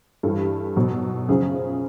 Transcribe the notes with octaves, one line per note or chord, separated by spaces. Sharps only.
G2 E3 G3 A4
B2 F#3
F#2 C#3 F3 G#4